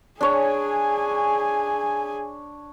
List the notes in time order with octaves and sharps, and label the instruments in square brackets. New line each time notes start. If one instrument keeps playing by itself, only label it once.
[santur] D4 C#5 [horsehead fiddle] G#4 G#5